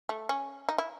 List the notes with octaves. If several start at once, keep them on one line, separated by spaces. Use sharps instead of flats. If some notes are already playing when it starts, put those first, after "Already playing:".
A3
C#4
D#4
E4